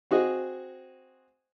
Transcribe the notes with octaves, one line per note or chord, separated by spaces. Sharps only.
C4 F#4 G#4 D#5